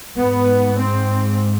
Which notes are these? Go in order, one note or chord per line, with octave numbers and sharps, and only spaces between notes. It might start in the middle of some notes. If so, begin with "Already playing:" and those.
G#2 B3
C4